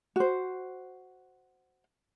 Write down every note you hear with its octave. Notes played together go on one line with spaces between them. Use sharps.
F#4 C5